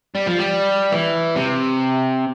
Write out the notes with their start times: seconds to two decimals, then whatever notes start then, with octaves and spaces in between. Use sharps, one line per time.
0.15 G3
0.27 F3
0.39 G3
0.92 E3
1.36 C3